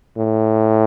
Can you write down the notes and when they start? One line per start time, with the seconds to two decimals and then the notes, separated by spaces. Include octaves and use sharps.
0.18 A2